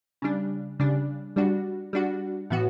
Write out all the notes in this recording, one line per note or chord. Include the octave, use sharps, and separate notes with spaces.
C#3 G3 D4
C#3 G3 D4
G3 D4 F#4
G3 D4 F#4
A2 E3 B3 F#4